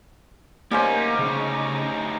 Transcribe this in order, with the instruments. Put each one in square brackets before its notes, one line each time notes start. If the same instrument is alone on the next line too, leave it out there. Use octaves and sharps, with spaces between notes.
[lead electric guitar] D2 D#4 [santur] G3 C#4 C5 [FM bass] A#3
[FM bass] C#3